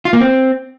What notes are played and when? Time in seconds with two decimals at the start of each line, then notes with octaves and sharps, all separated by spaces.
0.05 F4
0.13 A#3
0.21 C4